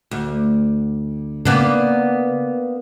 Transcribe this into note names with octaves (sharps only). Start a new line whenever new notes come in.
D2
C#3 A#3 B3 D4